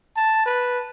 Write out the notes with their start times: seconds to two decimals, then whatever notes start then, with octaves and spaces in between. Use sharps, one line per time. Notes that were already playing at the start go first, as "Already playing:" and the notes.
0.16 A5
0.46 B4